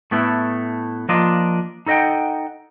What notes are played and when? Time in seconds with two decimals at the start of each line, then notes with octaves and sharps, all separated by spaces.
0.11 A2 A3 B3 E4
1.09 F3 A#3 D4 F4 D#5
1.86 D#4 A4 D#5 F#5 G5